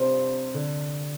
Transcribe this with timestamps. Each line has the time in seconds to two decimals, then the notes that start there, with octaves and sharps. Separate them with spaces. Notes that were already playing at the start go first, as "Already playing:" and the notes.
Already playing: G2 C3 F3 C4 G4 C5
0.54 D3